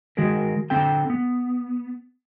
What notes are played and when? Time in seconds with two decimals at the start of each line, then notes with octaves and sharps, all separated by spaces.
0.17 D#3 G#3 F#4 G#4 A#4
0.70 D3 C4 A4 G5
1.10 B3